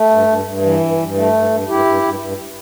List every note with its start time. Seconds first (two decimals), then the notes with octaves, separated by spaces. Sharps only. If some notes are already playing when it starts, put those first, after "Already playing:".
Already playing: A3
0.10 G2
0.27 G2
0.45 G2
0.63 E3
0.80 G2
0.97 G2
1.15 A3
1.33 G2
1.50 G2
1.68 G2 E4 G4
1.85 G2
2.02 G2
2.20 G2